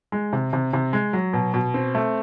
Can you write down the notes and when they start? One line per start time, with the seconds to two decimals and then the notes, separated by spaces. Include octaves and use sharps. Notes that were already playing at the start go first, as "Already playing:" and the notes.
0.12 G#3
0.33 C3
0.53 C3
0.73 C3
0.93 G#3
1.13 F#3
1.33 B2
1.54 B2
1.74 C4
1.95 A3